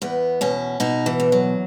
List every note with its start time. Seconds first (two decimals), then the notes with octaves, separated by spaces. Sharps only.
0.02 E2 B3
0.41 B2 C#4
0.80 B2 D#4
1.06 E3
1.20 E2
1.32 F#3